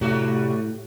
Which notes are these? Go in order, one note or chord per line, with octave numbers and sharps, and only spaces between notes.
A2 C3 G3 A3 F#4